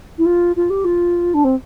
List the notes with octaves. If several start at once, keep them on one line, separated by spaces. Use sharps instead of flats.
E4
F4
F4
G4
F4
D4
C4